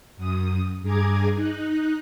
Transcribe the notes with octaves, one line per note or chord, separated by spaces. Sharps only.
F#2 D#6
G2 G#4 A#5 D6 G#6
D#4 F#6